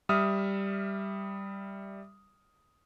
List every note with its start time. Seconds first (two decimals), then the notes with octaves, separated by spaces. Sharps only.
0.09 G3 E5 D#6 F6